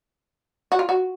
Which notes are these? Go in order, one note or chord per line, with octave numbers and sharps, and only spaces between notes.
F#4
F4
F#4